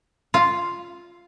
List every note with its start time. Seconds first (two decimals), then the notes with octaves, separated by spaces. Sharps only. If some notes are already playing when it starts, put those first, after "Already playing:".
0.34 F4